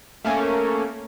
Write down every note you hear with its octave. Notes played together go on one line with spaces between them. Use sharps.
A3 A#3 C#4